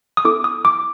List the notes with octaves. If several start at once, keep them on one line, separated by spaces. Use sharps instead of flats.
D#6
B3 E4 A4 D6
D#6
D6